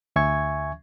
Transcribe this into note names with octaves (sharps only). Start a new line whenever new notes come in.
D2 E5 G#5 C#6 G#6